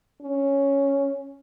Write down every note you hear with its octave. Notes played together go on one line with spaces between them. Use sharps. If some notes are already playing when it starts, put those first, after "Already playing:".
C#4